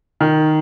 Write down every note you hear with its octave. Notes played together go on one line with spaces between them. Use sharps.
D#3